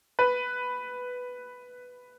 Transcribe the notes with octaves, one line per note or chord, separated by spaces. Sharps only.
B4